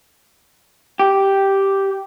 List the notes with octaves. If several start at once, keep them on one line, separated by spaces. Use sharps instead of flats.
G4